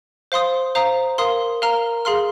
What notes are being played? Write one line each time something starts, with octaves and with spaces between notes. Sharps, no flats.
C5 F5 C6 D#6
C5 F5 A#5 D#6
A#4 F5 C6 D#6
A#4 F5 A#5 F6
G#4 F5 C6 F6